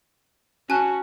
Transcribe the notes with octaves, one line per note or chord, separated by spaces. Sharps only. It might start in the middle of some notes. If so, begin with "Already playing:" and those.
C#4 F#4 G#5 A5 F#6